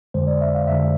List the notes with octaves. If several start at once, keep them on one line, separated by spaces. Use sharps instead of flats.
F2 D3 G#3 C5
D5
E5
F5
F2 D3 G#3 E5